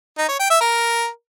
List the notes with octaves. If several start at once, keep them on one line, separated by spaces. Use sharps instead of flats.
D#4
C#5
G5
E5
A#4